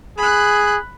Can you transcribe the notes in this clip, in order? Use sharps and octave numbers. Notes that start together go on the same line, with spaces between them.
G#4 B5 F#6